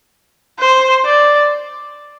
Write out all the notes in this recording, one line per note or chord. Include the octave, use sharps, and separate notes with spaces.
C5
D5